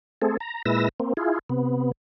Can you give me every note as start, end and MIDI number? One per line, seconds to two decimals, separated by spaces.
0.22 0.37 57
0.22 0.37 60
0.22 0.37 68
0.22 0.37 69
0.40 0.62 82
0.66 0.89 46
0.66 0.89 56
0.66 0.89 64
0.66 0.89 71
0.66 0.89 88
0.66 0.89 94
1.00 1.13 58
1.00 1.13 60
1.17 1.39 64
1.17 1.39 65
1.17 1.39 68
1.50 1.92 48
1.50 1.92 59